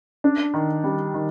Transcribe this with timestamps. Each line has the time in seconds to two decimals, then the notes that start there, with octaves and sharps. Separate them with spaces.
0.24 D4
0.54 D#3
0.84 G3
1.14 D#3